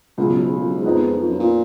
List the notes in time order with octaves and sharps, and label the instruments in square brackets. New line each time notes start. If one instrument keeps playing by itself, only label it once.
[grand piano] C#2 B2 F#3 [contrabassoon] F#2
[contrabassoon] F#2
G#2
F#2
F2
F#2
G#2
[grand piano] F2 F3 B3 D#4
[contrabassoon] F2
F#2
A#2